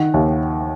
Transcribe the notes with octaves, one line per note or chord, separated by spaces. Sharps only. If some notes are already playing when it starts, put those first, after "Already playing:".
Already playing: D#3 F#5
D#2